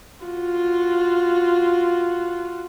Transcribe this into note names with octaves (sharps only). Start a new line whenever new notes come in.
F4 F#4